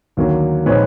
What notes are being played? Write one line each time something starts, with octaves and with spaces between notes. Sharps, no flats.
D#2 D3 F#3 A#3
A#2 F3 G#3 C4 D#4 B4 C#5